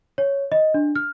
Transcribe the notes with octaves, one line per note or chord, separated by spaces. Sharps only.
C#5
D#5
D4
F6